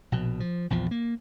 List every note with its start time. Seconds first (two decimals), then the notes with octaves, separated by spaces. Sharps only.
0.12 A#1 B2
0.40 F3
0.70 A#1 E2 F3
0.91 A#3